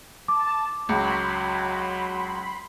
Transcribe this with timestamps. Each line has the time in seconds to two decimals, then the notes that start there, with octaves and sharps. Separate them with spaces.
0.28 A5 D6
0.89 C#2 F#3 B5 C6